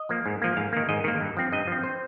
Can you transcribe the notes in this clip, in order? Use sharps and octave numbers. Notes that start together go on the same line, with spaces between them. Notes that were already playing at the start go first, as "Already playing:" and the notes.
Already playing: D#5
F3 A#3
G#2
F3 A#3
G#2 F5
D#3 A#3
G#2 D#5
D#3 A#3
G2
F3 C4
G2 D#5
F3 C4
C5